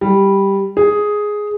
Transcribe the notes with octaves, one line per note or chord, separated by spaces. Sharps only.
G3
G#4